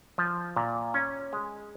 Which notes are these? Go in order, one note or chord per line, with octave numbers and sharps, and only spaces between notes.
F3
A#2
C#4
G#3